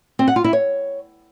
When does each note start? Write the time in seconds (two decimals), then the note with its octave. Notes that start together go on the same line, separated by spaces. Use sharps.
0.19 C4
0.28 F#5
0.36 F4
0.44 E4
0.53 C#5